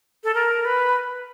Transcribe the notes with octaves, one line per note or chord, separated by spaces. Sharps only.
A4
A#4
B4